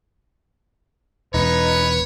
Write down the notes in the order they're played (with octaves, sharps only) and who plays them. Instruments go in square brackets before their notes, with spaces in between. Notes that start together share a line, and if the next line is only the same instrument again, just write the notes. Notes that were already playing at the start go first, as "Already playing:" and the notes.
[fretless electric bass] E1 [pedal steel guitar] D#4 [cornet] B4 [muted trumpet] C#5